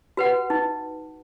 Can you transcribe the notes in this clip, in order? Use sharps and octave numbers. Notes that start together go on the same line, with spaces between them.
F#4 B4 F#5
D#4